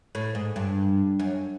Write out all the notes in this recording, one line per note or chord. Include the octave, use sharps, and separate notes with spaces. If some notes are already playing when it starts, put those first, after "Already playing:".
A2
G#2
G2
F#2